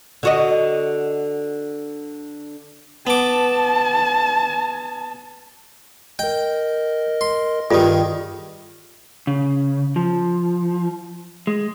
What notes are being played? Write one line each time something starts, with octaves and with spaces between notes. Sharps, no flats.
D3 F#4 D#5
B3 A5 D6
A#4 D#5 G5
C6
G2 D#3 F4 G#4 A4
C#3
F3
G#3